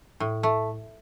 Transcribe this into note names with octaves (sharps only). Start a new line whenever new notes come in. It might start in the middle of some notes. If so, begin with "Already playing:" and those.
A2
A3